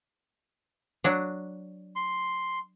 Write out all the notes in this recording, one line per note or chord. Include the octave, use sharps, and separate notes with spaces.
F#3 D4
C6